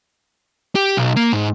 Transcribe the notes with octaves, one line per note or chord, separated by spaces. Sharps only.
G4
B1
A#3
G#2